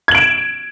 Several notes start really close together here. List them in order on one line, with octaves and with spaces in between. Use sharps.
G#6 F#7 D7 E7